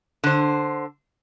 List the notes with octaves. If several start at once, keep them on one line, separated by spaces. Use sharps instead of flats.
D3 C5